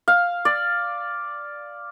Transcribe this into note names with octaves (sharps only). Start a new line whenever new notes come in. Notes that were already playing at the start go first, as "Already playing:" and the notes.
F5
D5